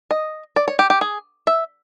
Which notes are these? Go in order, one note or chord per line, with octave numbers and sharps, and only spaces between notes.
D#5
D5
C#5
G4
G4
G#4
E5